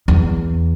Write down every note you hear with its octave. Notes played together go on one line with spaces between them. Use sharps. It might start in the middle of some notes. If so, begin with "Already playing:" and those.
E2